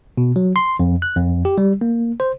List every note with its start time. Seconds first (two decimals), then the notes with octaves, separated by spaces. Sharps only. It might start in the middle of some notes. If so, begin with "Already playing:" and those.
0.17 B2
0.36 F#3
0.56 C6
0.79 F2
1.02 F#6
1.16 F2
1.45 G4
1.58 G3
1.81 A#3
2.20 C5